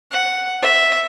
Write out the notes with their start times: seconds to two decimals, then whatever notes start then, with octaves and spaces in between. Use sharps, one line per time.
0.11 F#5
0.62 E5